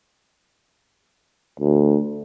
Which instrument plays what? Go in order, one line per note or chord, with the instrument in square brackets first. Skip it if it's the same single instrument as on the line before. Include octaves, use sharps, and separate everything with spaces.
[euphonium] D2